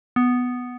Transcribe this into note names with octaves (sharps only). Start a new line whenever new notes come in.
B3